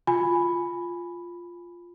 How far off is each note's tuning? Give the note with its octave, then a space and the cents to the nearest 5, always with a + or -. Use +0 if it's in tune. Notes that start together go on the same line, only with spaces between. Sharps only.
F4 +0 G#5 +0 B5 +0